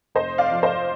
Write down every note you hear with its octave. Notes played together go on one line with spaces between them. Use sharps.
F1 C5 D#5
D5 F5
F3
C5 D#5